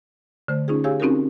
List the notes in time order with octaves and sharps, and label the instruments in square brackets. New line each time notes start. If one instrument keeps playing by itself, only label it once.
[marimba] D3 A3 C5
C#4 D#4 F4 G#4
G4 G#4 C#5 F5 G#5 E6
C4 C#4 D#4 F#4 G4 A#4